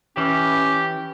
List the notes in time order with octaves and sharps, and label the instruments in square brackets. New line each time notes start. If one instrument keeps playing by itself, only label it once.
[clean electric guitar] E3 [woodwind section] C#4 [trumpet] G4